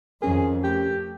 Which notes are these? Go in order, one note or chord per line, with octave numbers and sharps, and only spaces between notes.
F2 D#3 C#4 G#4 A#4
A3 G4